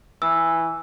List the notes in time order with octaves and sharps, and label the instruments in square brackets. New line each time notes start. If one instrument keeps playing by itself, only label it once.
[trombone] E3 [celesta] E6